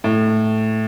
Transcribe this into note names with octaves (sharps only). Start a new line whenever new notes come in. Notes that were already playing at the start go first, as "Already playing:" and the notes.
A2